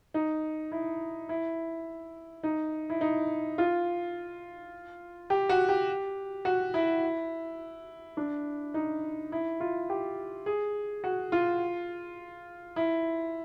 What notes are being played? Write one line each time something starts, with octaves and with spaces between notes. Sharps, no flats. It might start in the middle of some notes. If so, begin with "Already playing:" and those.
D#4
E4
E4
D#4
E4
D#4
F4
G4
F#4
G4
F#4
E4
D4
D#4
E4
F4
G4
G#4
F#4
F4
E4